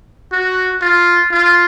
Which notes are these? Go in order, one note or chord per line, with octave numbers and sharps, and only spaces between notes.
F#4
F4
F4